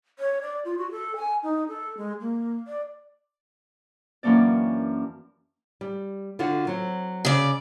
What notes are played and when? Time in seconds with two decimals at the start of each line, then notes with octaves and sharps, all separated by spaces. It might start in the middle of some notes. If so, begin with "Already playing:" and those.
0.19 C#5
0.41 D5
0.65 F4
0.78 F#4
0.91 A4
1.16 G#5
1.43 D#4
1.68 A4
1.97 G#3
2.21 A#3
2.67 D5
4.23 F#2 E3 A#3 C#4 D4 D5
5.81 G3
6.39 D3 F4 F#4
6.67 F#3 C4
7.25 C#3 D5